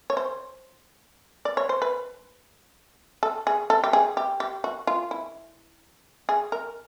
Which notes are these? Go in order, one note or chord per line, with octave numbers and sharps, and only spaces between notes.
C#5
C5
D5
C#5
C5
B4
A4
G#4
A4
G4
G#4
G4
G4
F#4
F4
E4
G#4
A#4